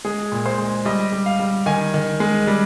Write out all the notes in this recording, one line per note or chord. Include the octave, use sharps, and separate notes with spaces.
G#3 G#4
A#2
C5
G#3
G3 D#5
G3
F5
G3
D#3 G#5
D#3
G#3
G3